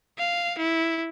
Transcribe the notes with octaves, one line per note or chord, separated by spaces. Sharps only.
F5
E4